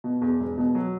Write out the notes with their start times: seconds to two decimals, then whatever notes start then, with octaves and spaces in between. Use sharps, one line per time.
0.04 B2
0.22 E2
0.40 E1
0.58 B2
0.75 F#3